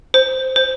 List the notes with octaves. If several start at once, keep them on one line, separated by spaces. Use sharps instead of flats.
C5
C5